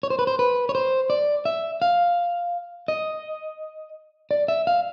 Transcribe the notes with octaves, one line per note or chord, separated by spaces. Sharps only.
C#5
C5
B4
C5
B4
C#5
C5
D5
E5
F5
D#5
D5
E5
F5